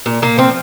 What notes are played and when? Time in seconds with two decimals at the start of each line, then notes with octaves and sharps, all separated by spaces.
0.06 A#2
0.22 A#2 A#3
0.38 F3 C4